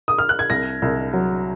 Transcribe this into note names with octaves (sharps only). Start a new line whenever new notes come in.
D#6
F6
F#6
G#6
C2 A#6
C2
F#3